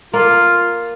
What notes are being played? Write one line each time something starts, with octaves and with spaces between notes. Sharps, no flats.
A#3 F4